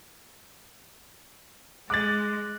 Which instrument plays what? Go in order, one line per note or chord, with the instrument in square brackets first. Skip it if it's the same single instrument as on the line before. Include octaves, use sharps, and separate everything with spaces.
[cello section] G#3 [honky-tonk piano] D6 A6 [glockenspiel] F#6 A#6 F#7